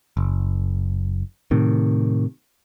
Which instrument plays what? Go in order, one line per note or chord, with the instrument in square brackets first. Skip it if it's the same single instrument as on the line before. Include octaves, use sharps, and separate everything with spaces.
[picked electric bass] F#1
A2 C3 D#3